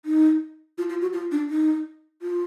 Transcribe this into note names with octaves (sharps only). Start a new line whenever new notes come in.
D#4
F4
F4
F#4
F4
D4
D#4
F4